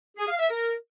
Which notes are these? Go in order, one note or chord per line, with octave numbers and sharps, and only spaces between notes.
G#4
F5
E5
A#4